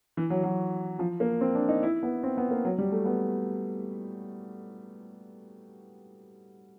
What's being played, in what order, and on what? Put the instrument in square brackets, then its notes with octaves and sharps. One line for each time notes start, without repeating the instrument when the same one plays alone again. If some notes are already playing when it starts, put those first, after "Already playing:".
[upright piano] E3
F#3
F#3
F3
A#3
C4
D4
D#4
E4
B3
C4
B3
A#3
F#3
G3
A3
B3